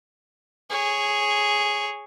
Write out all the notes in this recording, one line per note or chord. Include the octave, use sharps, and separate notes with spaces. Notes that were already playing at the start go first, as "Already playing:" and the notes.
G#4 C#5